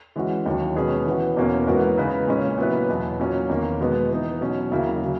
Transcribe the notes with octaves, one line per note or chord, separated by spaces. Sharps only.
E3 G#3 C#4 F#4
D#2 D#3 F#3
B2 G#3 C#4 G#4 B4
E3 B3 F#4
E2 B2 A#3 C#4
G#2 E3 B3 F#4 A#4
C#3 G#3 D#4 G#4 B4
A#2 G#3 C#4
A#2 F#3 B3 E4 B4
E2 B2 F#3
A#2 F#3 C#4
E2 D#3 A#3
B2 G#3 B3
E3 B3 D#4
B2 F#3 C#4
D#2 C#3 F#3 A#3 E4
C#3 F#3